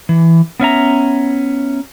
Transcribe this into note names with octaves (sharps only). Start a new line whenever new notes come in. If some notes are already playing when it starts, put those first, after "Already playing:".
E3
B3 C#4 E5 A#5